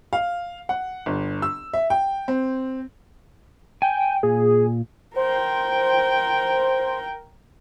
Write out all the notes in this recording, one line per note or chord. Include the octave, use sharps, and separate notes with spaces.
F5
F#5
G1
E6
E5
G5
C4
G5 G#5
A#2 G#4
A#4 C5 G5